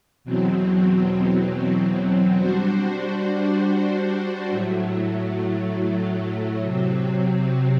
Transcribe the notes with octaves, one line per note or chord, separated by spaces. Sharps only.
E2 B2 F#3 C4
G3 D4 F#4 C5
A2 F#3 A3
C3 F#3 C4